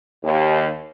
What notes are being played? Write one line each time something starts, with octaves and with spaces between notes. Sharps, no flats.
D#2